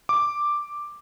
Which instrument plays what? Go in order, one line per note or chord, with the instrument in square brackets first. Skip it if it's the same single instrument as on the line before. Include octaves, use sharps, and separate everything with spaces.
[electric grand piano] D6